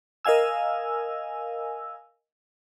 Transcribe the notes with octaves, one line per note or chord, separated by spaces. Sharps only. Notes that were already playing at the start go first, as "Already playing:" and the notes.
A#4 D#5 F5 G#5 E6